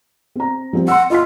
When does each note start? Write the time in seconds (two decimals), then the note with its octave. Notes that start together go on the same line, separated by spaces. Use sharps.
0.36 C4 A#5
0.73 F3 G3 C4
0.88 F#5 C6 E6
1.10 F4 D#5 C6 B6